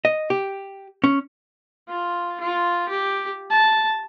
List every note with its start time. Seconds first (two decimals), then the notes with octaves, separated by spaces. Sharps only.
0.05 D#5
0.30 G4
1.04 C#4
1.89 F4
2.40 F4
2.89 G4
3.50 A5